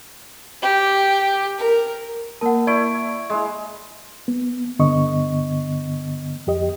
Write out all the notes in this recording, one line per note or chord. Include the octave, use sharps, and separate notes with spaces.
G4
A#4
A#3 A#4 F#5 A5
E4 D5 C#6 D7
G#3 E4
B3
G2 D3 B3 D#5 C#6
F2 G4 D#5